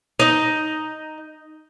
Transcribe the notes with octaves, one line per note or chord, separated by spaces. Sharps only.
D#4 D#5